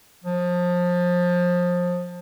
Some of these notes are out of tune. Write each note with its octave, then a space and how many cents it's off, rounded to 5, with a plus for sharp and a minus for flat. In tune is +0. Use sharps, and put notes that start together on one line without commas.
F3 +25